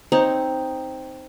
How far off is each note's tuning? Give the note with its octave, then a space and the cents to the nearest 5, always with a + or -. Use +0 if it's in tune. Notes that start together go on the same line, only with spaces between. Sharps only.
C4 +0 D#4 +0 C#5 -5